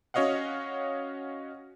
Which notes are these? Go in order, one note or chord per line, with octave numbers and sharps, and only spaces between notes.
C#4 F#4 C#5 D#5 F5 F#5